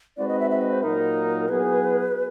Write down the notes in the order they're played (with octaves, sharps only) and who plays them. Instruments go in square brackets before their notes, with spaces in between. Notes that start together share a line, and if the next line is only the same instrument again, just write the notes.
[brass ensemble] G#3 C4 D#4 F#4 B4 [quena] D5
[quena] D#5
E5
E5
D#5
C5
[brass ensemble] A#2 F#3 A#3 D#4 [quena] A#4
[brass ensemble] F#3 B3 E4 G#4 [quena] B4